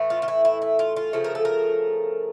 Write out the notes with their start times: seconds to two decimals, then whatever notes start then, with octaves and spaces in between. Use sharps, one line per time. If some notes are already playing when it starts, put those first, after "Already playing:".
Already playing: A2 E3 A3
0.10 F4
0.22 F4
0.28 E4
0.45 E4
0.62 E4
0.79 F4
0.96 F4
1.13 C#3 F3 A3
1.24 A#4
1.35 A4
1.45 A#4